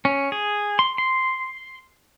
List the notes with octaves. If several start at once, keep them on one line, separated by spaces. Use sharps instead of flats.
C#4
G#4
C6
C6